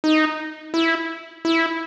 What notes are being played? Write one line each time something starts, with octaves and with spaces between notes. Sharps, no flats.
D#4
E4
E4